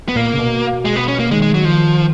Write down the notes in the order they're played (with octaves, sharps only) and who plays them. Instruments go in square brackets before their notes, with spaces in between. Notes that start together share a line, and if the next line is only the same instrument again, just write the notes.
[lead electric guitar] B3
[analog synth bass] A#2 [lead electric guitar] A#3
[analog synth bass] C#3
B2
[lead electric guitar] G#3
B3
C#4
A#3
[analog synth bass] D#3 [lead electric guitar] G#3
[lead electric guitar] G#3
F#3
F3